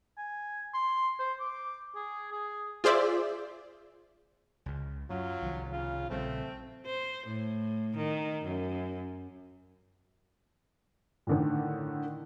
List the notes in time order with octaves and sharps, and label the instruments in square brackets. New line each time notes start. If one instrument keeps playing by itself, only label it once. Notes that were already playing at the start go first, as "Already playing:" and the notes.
[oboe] G#5
C6
C5
D6
G#4
G#4
[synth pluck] F4 G#4 C5 D5 E5
[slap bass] C#2 C#3
[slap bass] F#2 [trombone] F#3 [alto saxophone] F4
[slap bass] C2 D#3 F3
[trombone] C#3 [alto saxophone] F4
[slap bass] A#1 C#3 G3 [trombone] A3 [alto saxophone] C4
[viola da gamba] C5
A2
D#3
F#2
[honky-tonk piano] A2 D3 D#3